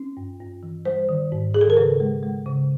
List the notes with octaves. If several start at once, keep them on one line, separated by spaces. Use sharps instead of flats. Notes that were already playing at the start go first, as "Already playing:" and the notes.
Already playing: C#4
G2
G2
E3
G3 C5
D#3
G#2
D#3 G#4
A4
A#4
C#3 B4
G#3
G#3
C#3